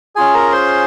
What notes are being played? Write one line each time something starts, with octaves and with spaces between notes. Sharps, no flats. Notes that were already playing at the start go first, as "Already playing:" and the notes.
C#4 F4 G#4 G#5
A#4 A#5
C5 C6